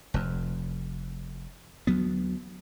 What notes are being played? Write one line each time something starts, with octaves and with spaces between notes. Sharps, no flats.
F1 F2
D2 F#3 B3